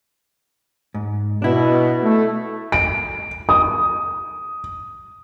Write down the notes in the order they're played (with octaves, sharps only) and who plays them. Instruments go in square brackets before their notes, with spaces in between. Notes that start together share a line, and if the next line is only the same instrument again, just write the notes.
[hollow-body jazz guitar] G#2
[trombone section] B2 [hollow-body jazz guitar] D4 E4
[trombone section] A3
[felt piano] D7
D#6